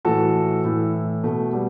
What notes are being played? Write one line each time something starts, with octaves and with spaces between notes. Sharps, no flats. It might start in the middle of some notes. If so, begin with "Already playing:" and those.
A2 E3 F#4 A4
A2 E3
B2 A3
G3 B3